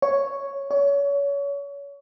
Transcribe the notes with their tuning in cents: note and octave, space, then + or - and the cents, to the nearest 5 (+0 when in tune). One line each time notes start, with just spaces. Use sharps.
C#5 +0
C#5 +30